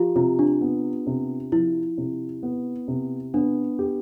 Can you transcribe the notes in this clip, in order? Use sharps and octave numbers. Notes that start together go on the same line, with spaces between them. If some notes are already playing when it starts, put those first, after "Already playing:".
Already playing: F3 F4 G4
C3 F4
D4
B3
C3
F3 E4
C3
B3
C3
B3 D4
G4